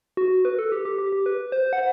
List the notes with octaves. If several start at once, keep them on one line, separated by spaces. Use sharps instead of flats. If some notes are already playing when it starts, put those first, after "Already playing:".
F#4
B4
A4
G4
G4
G4
G4
B4
C5
F#5